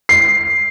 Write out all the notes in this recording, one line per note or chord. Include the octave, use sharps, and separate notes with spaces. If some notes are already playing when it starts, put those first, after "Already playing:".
C7